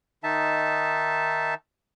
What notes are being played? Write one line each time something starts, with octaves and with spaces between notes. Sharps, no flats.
D#3 D#4 E5 A5